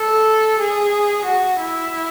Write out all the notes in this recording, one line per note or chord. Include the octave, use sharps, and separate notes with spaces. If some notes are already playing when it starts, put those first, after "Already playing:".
Already playing: A4
G#4
F#4
E4